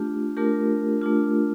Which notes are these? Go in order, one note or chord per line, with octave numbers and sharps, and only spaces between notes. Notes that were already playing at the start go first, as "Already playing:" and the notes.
Already playing: A3 D4 F4 G4
A3 D4 F4 G4 A#4
A3 D4 F4